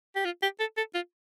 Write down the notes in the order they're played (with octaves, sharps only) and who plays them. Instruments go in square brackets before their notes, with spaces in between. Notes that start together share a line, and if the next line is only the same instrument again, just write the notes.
[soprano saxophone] G4
F4
G4
A4
A4
F4